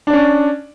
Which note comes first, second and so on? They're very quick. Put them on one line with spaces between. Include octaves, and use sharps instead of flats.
D4 D5 C#4